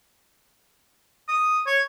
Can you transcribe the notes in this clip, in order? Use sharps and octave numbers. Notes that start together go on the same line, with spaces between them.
D#6
C#5